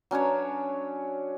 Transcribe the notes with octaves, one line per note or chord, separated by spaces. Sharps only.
F#3 C#4 D4 C#5